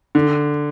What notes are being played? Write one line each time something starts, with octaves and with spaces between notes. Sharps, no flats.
D3